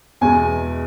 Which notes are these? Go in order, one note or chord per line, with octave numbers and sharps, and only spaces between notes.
E2 B2 G#3 G#5